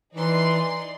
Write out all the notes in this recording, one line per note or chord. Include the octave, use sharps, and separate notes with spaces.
E3 D#4 D5 C6